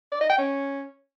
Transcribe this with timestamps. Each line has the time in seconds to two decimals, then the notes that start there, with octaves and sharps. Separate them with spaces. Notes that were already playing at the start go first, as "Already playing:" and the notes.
0.12 D5
0.21 D#5
0.29 G5
0.38 C#4